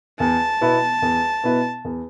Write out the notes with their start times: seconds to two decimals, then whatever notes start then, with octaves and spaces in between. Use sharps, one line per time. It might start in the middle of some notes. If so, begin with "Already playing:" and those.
0.20 E2 A5
0.61 B2 B3 E4 B4
1.02 E2
1.44 B2 B3 E4 B4
1.85 E2